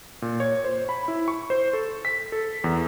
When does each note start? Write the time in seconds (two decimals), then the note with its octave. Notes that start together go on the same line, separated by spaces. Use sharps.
0.22 A#2
0.40 C#5
0.65 C5
0.89 B5
1.08 E4
1.28 C#6
1.50 C5
1.73 A4
2.05 B6
2.32 A4
2.64 E2